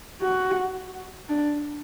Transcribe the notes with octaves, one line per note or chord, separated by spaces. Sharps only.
F#4
D4